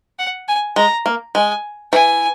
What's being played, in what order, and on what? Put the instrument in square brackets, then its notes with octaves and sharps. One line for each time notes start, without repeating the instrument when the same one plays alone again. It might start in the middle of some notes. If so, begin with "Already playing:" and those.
[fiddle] F#5
G#5
[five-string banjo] G#3 [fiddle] A#5
[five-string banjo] A#3
[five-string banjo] G#3 [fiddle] G#5
[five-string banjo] E3 [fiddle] G#5